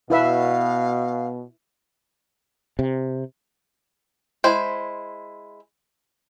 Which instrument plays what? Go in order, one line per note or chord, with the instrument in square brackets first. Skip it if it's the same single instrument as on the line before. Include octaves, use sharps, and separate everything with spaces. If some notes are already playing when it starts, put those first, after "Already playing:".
[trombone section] B2 [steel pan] E4 B4 E5 [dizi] F5
[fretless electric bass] C3
[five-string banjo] G#3 E4 C5